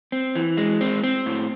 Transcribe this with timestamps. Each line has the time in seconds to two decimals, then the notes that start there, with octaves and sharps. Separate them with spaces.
0.12 C4
0.35 E3
0.57 G#3
0.81 C4
1.04 C4
1.26 A2